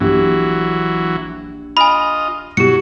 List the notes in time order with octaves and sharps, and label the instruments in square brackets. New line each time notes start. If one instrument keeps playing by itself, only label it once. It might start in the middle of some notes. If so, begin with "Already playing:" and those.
[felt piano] A#1 G4 [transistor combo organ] E3 F#3
[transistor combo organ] F4 D#5 [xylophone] G#5 B5
[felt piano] B2 E4 [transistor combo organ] F#3 [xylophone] G4 C#7